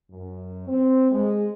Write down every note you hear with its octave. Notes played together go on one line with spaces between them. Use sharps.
F#2
C4
G#3